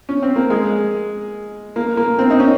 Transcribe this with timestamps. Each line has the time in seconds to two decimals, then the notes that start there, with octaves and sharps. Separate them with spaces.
0.09 C#4
0.22 C4
0.36 A#3
0.50 G#3
1.76 A#3
1.97 A#3
2.19 C4
2.30 D#4
2.40 C#4